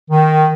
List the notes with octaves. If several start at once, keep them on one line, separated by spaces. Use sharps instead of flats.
D#3